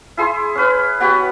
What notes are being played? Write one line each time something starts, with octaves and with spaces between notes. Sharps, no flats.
E4 G#4 C6
C#4 B4
B3 F#4 G4 F#5